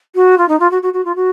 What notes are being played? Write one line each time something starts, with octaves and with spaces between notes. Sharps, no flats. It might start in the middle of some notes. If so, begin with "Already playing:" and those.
F#4
F4
D#4
F4
F#4
F#4
F#4
F4
F#4